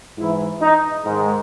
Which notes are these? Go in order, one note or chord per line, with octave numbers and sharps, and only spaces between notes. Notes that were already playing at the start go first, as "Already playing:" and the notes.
G#2 E3 E4
D#4
G#2 D#3 G#3